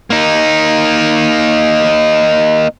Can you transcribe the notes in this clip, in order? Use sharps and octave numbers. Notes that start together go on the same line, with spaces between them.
A#3 D#4